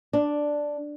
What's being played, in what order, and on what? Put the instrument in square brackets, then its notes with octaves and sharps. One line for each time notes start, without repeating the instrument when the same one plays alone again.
[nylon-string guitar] D4